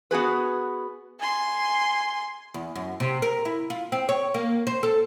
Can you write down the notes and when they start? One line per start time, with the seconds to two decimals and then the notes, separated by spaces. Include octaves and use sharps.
0.11 B3 F#4 G#4 B4
1.19 G#5 C6
2.54 E2
2.75 F#2
3.00 C3
3.22 A#4
3.45 E4
3.70 F4
3.92 C4
4.09 C#5
4.34 A#3
4.67 C5
4.83 A4